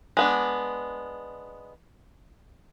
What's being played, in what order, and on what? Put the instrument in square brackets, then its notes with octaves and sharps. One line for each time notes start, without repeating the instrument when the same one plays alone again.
[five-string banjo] G#3 B3 D4